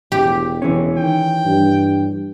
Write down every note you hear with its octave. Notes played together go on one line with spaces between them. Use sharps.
E1 G4
E3 C#4
D#3 G5
G2